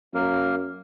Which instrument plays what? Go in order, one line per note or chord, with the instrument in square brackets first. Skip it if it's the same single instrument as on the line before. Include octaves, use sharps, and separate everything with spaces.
[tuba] F#2 [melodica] A#3 A#4